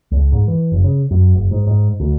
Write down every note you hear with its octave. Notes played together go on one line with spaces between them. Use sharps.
C#2
G#2
E3
F#1
C#3
F#2
F#1
G#2
G#2
D2